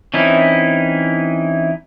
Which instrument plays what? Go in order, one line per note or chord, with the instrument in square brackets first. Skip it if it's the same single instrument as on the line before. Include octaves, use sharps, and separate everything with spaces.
[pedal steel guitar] E3 C4 C#4 D#4 E4